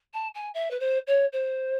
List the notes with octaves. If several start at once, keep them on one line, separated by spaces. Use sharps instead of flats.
A5
G#5
E5
B4
C5
C#5
C5